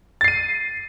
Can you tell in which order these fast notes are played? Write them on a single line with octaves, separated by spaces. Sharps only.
A6 C7 D#7